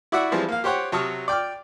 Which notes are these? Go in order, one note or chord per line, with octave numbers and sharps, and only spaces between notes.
E4 F#4 D5 E5 F#5
E3 F3 G3 G#3 C4
A#3 F5
G4 C5 C#5 F#5 G5
C3 F#3 A5 C#6 D#6 F6
D5 G5 D6 F6